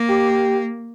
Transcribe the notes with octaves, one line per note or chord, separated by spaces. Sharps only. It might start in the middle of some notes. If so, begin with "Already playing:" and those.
Already playing: A#3
G4